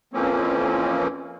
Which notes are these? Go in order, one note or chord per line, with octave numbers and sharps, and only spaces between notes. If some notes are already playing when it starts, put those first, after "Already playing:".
F2 E3 F3 A#3 C4 C#4